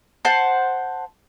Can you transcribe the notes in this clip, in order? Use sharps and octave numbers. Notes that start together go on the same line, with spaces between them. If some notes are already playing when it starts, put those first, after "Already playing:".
C5 F#5 A5